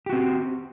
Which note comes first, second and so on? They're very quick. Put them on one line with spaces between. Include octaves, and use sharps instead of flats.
G4 F#4 C4